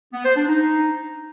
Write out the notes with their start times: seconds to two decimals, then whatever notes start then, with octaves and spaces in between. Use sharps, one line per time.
0.13 B3
0.25 C5
0.37 D4
0.49 D#4